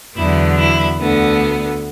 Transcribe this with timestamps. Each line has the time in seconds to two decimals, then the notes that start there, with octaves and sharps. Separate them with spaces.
0.16 E2 D3 F#3 B3 E4
0.58 E4
0.99 D2 D3 B3